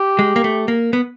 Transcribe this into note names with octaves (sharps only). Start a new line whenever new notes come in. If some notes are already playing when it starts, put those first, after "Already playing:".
Already playing: G4
G#3
A#3
A3
A#3
B3